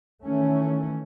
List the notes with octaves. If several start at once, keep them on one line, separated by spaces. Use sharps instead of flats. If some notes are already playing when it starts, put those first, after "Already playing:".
D#3 E3 A3 C#4